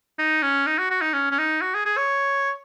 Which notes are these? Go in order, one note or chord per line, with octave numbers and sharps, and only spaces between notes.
D#4
C#4
D#4
F#4
F#4
D#4
C#4
C#4
D#4
F#4
G#4
G#4
C#5